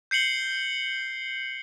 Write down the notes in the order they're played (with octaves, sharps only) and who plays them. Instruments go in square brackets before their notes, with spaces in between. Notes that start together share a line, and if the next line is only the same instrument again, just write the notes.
[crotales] G6 C7 C#7 F#7 G7